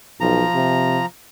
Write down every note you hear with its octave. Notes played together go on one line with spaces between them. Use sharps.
B1 F3 A#5
C3